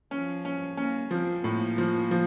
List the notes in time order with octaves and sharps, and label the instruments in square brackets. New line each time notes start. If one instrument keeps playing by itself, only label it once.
[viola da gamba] F3 [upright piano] C#4
[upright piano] C#4
[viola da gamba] A#3 [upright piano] C#4
[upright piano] F3 [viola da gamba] C4
[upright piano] A2 [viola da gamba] A#3
[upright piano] F3
F3